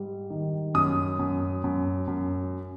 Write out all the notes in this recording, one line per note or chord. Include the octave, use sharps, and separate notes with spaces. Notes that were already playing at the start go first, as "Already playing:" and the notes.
Already playing: G#2 G3
D#3
F#2 D#6
F#2
F#2
F#2